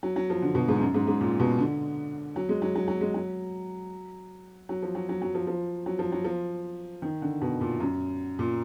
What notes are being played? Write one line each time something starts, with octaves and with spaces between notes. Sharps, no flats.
F#3
F#3
F3
D3
B2
G#2
F#2
G#2
G#2
A#2
B2
D3
F#3
G#3
F#3
F#3
F#3
G#3
F#3
F#3
F3
F#3
F#3
F#3
F3
F3
F#3
F3
F#3
F3
D#3
D3
B2
A#2
F#2
A#2